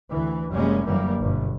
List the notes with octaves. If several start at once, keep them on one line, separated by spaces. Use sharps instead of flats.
D2 E3
F1 F#2 G3 G#3 A#3 C#4
F#2 D3 E3 G3 A#3
G1 B2